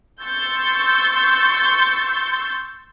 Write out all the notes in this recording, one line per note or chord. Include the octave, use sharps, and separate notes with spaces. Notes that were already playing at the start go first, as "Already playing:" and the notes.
C6 C#6 E6 G6 A6